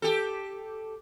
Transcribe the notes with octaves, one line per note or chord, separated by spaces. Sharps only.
G4 A4